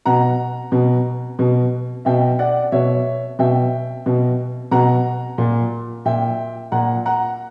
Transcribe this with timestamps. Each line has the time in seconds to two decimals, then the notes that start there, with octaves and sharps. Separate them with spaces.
0.06 B2 F#5 A#5
0.72 B2
1.39 B2
2.05 B2 E5 G5
2.39 D5 F#5
2.72 B2 C#5 E5
3.39 B2 E5 G5
4.06 B2
4.71 B2 F#5 A#5
5.38 A#2
6.05 A#2 E5 G5
6.72 A#2 F#5 A#5
7.06 F#5 A#5